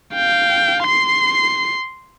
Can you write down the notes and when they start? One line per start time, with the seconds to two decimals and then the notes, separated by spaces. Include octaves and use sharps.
0.14 F5 G5
0.84 C6 C7